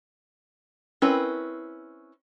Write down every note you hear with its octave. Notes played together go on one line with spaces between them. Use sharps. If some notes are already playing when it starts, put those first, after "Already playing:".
C4 C#4 E4 A#4 B4